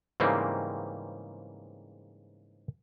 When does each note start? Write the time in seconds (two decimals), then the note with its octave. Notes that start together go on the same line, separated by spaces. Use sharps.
0.20 G#2 C#3 E3 G3 A#3 C4